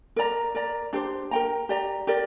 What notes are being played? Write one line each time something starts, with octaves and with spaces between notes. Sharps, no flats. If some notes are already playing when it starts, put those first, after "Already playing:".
A#4 D5 A#5
A#4 D5 A#5
D4 G4 C5
A#4 G5 A#5
G4 D5 A#5
G4 A#4 D5